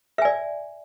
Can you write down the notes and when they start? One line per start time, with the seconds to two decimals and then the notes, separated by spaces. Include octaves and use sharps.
0.18 E5
0.22 G#5
0.25 D5